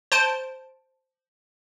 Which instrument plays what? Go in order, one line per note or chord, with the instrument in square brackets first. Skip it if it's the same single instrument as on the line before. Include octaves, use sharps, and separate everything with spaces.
[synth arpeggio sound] C5 A5 D7